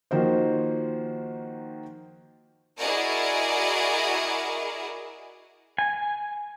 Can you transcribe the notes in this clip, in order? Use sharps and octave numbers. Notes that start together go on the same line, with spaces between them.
D#3 F3 A#3 F#4 C5
E4 F#4 G#4 A#4 D5 D#5
G#5